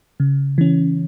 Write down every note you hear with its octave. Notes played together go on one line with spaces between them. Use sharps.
C#3
E3 C#4